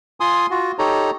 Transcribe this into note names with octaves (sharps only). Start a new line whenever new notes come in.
F4 G#5 C6 D#6
F4 F#4
D#4 G4 A4 C#5 A#5